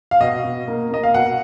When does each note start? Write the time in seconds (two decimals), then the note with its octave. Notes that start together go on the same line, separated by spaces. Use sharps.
0.11 F5
0.20 B2 D#5
0.44 B2
0.68 A#3
0.91 A#3 D#5
1.03 F5
1.14 B2 F#5